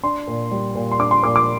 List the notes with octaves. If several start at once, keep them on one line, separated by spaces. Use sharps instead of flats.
D4 C6
A#2
G3
A#2
C6
D4 D6
C6
A#2 D6
D6